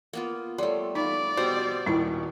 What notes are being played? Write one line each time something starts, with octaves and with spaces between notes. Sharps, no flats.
A#3 B3 F4
G3 A3 A4 C#5 C6
D#4 D5 F5 B5
B2 G4 C5 A#5
D#1 D#3 E4 C#6